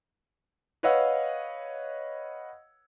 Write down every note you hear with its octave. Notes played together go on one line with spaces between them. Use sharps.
B4 C#5 D#5 F5 F#5 E6